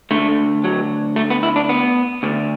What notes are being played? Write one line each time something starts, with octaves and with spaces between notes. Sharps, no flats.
D2 D3 A3
F#3
A3
B3
E4
D4
B3
D2 D3